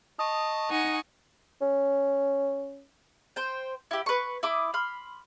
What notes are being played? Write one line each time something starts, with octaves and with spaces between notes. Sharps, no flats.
D#5 A5 C#6 D#6
D#4 F#5 G#5
C#4
C5 G5
E4 G4
B4 C#6
E4 D6 D#6
B5 C6 F6